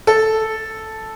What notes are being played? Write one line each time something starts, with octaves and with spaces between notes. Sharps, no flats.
A4